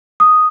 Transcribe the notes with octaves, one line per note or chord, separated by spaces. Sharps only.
D#6